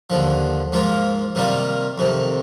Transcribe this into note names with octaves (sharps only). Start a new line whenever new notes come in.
D#2 D3 F3
G#2 F3 A#3 F4
C3 D#3 G3 A#3 F4
F2 C3 D#3